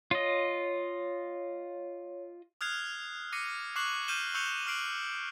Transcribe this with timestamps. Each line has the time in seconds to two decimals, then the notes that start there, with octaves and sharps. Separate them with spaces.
0.11 F4 C#5 D#5
2.61 D#6 F6 F#6 G#6 C7 F7
3.33 D6 A#6 C7 C#7 D#7
3.76 C#6 D6 F#6 C7 E7 F#7
4.08 F6 G6 D#7 E7 G7
4.34 C#6 E6 G6 C#7 F7 G7
4.66 C#6 F6 F#6 C7 D7 F#7